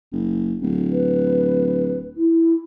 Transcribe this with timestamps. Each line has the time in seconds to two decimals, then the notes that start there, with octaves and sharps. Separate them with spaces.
0.12 F#1
0.62 D1
0.91 B4
2.16 E4